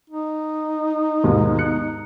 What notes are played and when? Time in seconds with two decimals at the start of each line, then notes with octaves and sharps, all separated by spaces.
0.10 D#4
1.24 D#2 G#2 B2
1.59 F#6 C#7